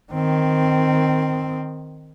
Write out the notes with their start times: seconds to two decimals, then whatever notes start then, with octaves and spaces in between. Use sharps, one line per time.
0.13 D#3 C4